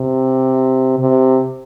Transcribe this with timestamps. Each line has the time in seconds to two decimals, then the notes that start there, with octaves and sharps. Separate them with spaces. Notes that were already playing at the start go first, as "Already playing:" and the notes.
Already playing: C3
1.00 C3